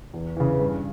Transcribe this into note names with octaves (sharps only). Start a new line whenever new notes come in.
E2
C#3 E3
G2